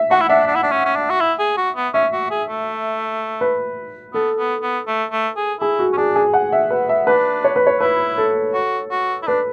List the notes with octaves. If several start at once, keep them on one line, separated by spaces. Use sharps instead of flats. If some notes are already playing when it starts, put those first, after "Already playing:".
Already playing: E5
F#4 F#5
E4
D4 E5
D4
E4
D4
C#4
C#4
D4
F#4
E4
G#4
F#4
B3
C#4 E5
F#4
G#4
A3
B4
B3 A4
B3
B3
A3
A3
G#4
E4 G#4
F#4
C#4
D4 G#4
G#4
F#5
E5
B4
E5
D4 B4
C#5
B4
C#5
E4 B4
A4
F#4
F#4
E4
D4 B4